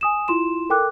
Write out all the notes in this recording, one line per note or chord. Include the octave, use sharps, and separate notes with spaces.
G#5 D#6 E7
E4 F4 C6 E7
A4 A#4 G5 D6 F#6